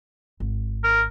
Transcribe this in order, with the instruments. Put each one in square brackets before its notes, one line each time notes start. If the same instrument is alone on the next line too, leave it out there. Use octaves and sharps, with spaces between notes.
[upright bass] G#1
[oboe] A#4